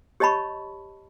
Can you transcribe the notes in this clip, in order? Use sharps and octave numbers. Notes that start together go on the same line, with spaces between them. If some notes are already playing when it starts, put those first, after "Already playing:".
G4 C#5 D#5 A5 B5 C#6